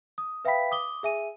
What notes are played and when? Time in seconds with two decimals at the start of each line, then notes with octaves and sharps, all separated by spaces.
0.18 D#6
0.45 B4 E5 F5 G5 B5 B6
0.71 D6 D#6 G7
1.03 G#4 E5 G#5 D#7